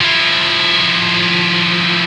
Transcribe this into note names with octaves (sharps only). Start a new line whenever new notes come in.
F3 E4